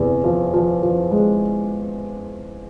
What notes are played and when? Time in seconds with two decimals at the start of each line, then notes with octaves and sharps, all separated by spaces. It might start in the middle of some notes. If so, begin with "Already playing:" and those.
Already playing: E2 C3 G#4
0.24 F3
0.53 F3
0.83 F3
1.11 G#3